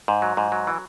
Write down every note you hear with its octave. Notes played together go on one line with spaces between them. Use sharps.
G#2
F#3
G#2
F#3
E3